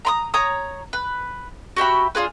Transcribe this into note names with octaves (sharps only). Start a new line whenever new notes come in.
A#5 B5 D#6
C#5 A#5 D#6
B4
F#4 G4 E5 B5
D4 F4 G#4 B4